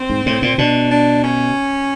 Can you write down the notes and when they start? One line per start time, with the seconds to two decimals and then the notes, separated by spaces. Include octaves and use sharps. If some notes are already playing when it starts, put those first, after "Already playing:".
Already playing: C4
0.10 G#2
0.26 A2
0.42 A#2
0.58 B2 D4
0.91 D4
1.23 C#4